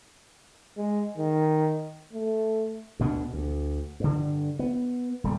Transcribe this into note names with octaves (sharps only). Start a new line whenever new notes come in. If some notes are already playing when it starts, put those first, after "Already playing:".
G#3
D#3
A3
D2 B2 B3 D4
D2
G2 D3
B3
D#1 G3